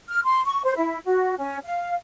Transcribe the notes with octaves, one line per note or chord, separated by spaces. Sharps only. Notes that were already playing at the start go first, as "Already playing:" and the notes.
F6
C6
C#6
C5
E4
F#4
C#4
F5